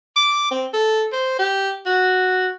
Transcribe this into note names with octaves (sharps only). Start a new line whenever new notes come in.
D6
C4
A4
C5
G4
F#4